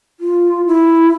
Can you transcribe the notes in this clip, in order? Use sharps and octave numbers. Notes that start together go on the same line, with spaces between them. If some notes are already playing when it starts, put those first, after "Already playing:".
F4
E4